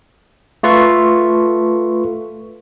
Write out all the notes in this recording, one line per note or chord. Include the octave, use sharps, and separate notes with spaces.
A3 F4 A4 B4 C#6